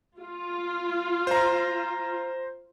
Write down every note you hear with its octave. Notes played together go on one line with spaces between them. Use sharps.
F4
C5 A#5